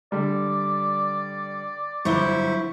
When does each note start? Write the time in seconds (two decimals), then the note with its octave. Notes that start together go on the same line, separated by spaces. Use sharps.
0.12 D3 G3 D5
2.05 G1 F#3 E4 C5 C#6 G7